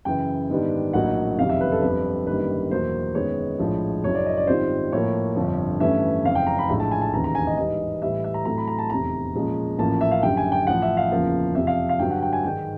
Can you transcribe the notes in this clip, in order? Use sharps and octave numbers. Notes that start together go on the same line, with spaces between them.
F#2 C#3 E3 G5
G#2 D#3 G3 B3 D4
A#1 A2 F#3 A#3 D#4 F#5
F#1 F2 C3 D#3 G3 F5
E5
B4
A4
G1 F2 D3 G3 B4
G1 F#2 D#3 G3 A#3 B4
E2 B2 F#3 A#3 C5
F#2 D#3 G#3 B3 C#5
A#1 A2 F3 G#3
F#1 F#2 C#3 F#3 C#5
D5
D#5
D5
G#2 D#3 G3 C4 F4 C5
A2 F3 A#3 C#5
G1 F2 D3 F3
G2 E3 A3 C#4 E5
F#1 F2 C#3 F5
G5
A#5
B5
A#1 A2 F3 G#3
A5
G#5
A5
E1 D#2 C#3 E3 A#5
A#5
G#5
D#5
G#2 E3 G3 D#5
A2 E3 G3 E5
E5
A#5
A2 F#3 A3 C4 A#5
B5
A#5
A5
F1 E2 C3 A#5
A#2 F3 G#3 C#4
A1 A2 F3 A#3 C#4 A5
E5
F5
F#1 F#2 D3 G3 G5
G#5
G5
A1 A2 F3 F#5
E5
F5
F#1 E2 C#3 F3 A#3
F2 C3 F3 E5
F5
F5
G2 D3 F#3 G5
F#5
G5
G#5
G#2 D#3 G#3 G5